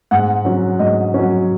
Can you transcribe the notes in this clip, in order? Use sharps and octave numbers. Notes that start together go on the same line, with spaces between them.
G#2 F#5
F#3 C#4
G#2 D#5
F#3 C#4